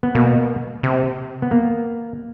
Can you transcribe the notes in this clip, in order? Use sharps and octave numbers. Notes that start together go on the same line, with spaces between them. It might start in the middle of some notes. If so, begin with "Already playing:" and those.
B3
B2 A#3
C3
B3
A#3